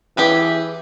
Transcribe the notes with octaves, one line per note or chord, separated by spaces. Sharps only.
E3 G4 G#4 B4